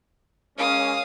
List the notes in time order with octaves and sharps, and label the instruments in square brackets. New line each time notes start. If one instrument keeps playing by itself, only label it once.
[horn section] G#3 A#3 C#4 [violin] F5 D#6